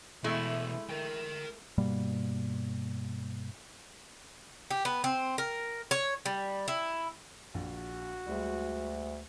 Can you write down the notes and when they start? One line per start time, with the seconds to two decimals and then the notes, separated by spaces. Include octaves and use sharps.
0.24 B2 E3 G#3 A3 E4
0.90 A#4 G5
1.78 G2 B2 G3 A#3
4.71 G4
4.85 B3
5.04 C4
5.38 A#4
5.91 C#5
6.26 G3
6.68 E4
7.54 A#1 F#4
8.26 D2 G3 G#3